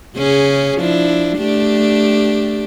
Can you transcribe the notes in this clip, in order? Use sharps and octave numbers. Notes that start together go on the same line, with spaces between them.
C#3 C#4 G#4
F3 D4 E4
A3 D4 G4